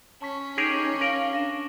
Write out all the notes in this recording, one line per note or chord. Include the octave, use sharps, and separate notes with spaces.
C#4 A5 C#6 B6
D#4 G4 G#4 A#4 C#6 D6
A#4 F5 F#7 G7
D4 A#6 D#7 E7